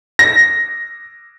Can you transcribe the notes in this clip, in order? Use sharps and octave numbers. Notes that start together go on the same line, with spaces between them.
A#6